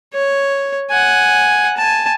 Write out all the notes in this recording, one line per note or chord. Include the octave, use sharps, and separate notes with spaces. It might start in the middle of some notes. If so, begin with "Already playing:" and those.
C#5
F#5 G#5
G#5 A5